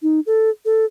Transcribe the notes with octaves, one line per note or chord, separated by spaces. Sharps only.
D#4
A4
A4